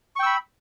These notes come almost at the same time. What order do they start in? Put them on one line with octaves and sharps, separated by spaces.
C#6 G5 E6 B5